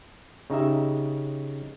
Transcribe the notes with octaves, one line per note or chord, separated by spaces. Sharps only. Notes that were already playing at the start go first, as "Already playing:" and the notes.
C#3 D#4 G4 E5